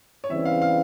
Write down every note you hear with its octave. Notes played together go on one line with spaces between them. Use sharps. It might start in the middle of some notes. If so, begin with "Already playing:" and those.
C#5
E2 C#3 E3 G3 C4 E5
F5
F5